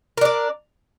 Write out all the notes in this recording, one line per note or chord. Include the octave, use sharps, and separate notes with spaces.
D4 A#4 D5